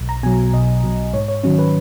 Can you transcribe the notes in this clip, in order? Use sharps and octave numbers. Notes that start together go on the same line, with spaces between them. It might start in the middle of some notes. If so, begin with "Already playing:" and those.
Already playing: B1
A#5
B2 F#3 G#5
B1 D#5
B2 F#3
G#2 C#5
C#5
D#3 F#3 C#4
B4